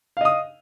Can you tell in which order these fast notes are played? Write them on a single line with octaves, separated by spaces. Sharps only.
F5 D#5 D#6